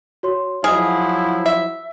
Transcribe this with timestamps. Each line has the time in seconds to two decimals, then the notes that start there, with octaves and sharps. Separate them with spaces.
0.23 F#4 C#5 C6
0.64 F3 F#3 E4 G#4 D#5 F6
1.46 E5